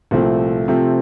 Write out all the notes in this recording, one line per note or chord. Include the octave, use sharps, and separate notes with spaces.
C2 A#2 F3 A3 C4
C3 F3 A3 C4